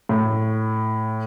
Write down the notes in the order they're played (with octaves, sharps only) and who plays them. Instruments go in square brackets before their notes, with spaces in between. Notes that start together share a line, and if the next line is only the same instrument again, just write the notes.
[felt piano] A2